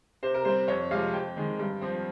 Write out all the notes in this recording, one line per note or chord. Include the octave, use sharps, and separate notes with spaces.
C3 C5
A#4
G3 C4 C5
F2 C#5
C3 F3 G#3 F5
F2 G5
D#3 G#3
G2
F3 C4